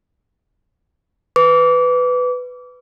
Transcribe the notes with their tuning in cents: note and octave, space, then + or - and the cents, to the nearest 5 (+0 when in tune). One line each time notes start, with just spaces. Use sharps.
B4 +10 D6 -30